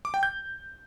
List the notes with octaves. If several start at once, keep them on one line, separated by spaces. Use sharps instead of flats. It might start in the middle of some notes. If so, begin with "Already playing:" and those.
D6
G5
G6